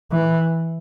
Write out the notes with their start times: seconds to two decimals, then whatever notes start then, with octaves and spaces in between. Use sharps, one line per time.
0.12 E3